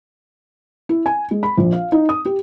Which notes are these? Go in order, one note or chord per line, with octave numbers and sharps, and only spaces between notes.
E4
G#5
G#3
B5
A#1
F5
D#4
D#6
G4